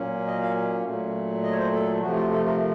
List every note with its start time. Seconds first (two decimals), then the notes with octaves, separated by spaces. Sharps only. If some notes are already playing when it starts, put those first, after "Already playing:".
Already playing: A#2 F#3 A#3 C#4
0.27 D#5
0.42 F5
0.85 A#2 F#3 A3
1.44 D#5
1.51 C#5
1.58 C5
1.72 A4
2.02 C3 F3 A3 F#4
2.16 F4
2.31 A4
2.45 A#4